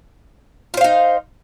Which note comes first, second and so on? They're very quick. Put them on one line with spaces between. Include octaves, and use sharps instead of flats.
F4 C5 F5 D#4